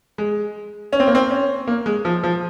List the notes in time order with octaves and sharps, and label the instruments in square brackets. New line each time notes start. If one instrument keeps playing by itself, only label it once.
[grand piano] G#3
C#4
C4
A#3
C4
C#4
A#3
G#3
F3
F3